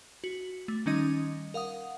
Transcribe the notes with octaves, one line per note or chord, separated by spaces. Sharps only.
F#4
A3
D#3 G3 C#4 D#4 D#5 D#6
A#4 F5 F#5 D#6